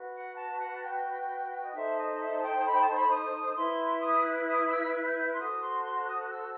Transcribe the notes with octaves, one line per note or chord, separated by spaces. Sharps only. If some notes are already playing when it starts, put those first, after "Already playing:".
Already playing: F#4 B4
F#5
A5
F#5
A5
G5
D#5
D#4 A4 C5 E5
D#5
E5
G5
B5
G5
A5
B5
D#6
E4 B4 C6
D#6
F#6
D#6
E6
F#6
G6
G6
F#6
C6
F#4 A4 C5 D#6
C6
C6
F#6
D#6
F#6
E6